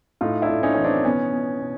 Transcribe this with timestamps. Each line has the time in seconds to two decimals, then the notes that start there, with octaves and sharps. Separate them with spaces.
0.21 A2 D#4 F4
0.42 D4 E4
0.49 A2
0.63 C#4 D#4
0.74 E3 C#4
0.84 C4 D4
1.05 B2 B3 C#4
1.33 B2
1.61 B2